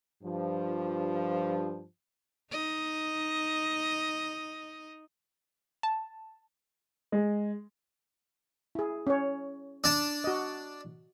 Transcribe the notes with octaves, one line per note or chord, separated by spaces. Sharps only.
G2 F3
D#4 D#5
A5
G#3
E4 G#4
C#4 C#5
D4 A5
F#4 D#5